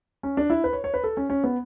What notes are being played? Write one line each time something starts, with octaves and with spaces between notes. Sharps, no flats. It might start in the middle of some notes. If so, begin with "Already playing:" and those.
C#4
D4
E4
B4
C#5
C#5
B4
A4
C#4
C#4
B3